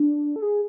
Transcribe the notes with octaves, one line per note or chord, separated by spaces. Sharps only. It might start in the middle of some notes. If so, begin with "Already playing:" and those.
Already playing: D4
A4
G#4